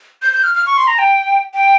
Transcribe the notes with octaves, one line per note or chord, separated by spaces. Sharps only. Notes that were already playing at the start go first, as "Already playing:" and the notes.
G6
G6
F6
F6
C#6
C6
A#5
G5
G5